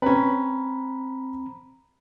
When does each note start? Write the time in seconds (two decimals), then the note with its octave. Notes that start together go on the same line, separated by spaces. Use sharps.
0.02 C4 C#4 B4 A#5 B5